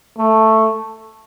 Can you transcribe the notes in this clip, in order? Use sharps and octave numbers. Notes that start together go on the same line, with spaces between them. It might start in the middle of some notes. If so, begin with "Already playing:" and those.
A3